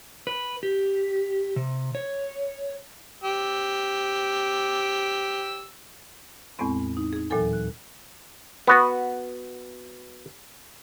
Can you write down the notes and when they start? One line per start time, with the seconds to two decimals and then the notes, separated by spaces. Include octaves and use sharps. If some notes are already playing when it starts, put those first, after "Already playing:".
0.27 B4
0.63 G4
1.56 C3
1.95 C#5
3.24 G4 E6
6.59 E2 A2 G#3 B3 C4
6.97 D#4
7.13 D#4 G#4
7.30 D#2 A#2 E3 F#3 A4 G#5
7.53 F#6
8.67 B3 F#4 B4